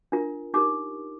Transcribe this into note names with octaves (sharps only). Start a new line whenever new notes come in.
D4 F4 A#4
D#4 G4 A#4 D6